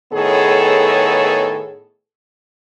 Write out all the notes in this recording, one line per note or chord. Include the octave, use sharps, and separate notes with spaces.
A2 D#3 B3 G#4 A4 C#5